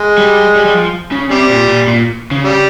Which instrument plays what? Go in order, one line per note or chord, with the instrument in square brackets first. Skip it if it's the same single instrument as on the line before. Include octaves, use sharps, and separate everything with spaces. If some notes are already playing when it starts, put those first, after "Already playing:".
Already playing: [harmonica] G#3
[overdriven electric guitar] G3
G3
G3
F3
C#3
[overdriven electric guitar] C3 [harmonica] G3
[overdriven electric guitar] A#2
A#2
A#2
C#3
[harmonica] G3